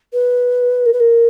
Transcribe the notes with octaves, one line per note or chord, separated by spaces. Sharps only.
B4
A#4
B4
A#4